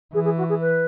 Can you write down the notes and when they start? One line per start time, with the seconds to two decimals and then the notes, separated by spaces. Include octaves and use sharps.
0.14 E3 G#4
0.24 G#4
0.37 F#4
0.49 G#4
0.60 B4